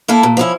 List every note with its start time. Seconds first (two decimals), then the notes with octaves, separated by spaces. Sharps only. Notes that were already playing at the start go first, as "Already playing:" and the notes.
0.08 A#3 E4 A4
0.23 A#2
0.37 F3 C#4 E4